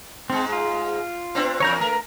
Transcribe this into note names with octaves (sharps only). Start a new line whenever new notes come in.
G#2 G#3 C4
F4
B3 C4 D4
E2 A#4 C#5 A#5 G6
A3 A#4 B4